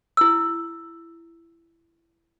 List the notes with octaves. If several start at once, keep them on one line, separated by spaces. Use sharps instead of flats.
E4 E6